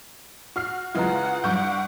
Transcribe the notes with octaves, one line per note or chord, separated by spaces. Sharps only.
F#4 F6 C7
C#3 G#3 E4 F4 B4 F#5 A#5
G2 F#5 C#6 G6